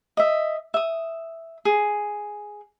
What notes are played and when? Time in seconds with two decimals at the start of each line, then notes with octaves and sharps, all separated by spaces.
0.17 D#5 E5
0.74 E5 D#6
1.65 G#4